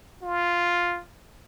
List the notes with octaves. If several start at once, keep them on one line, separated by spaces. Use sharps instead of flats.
F4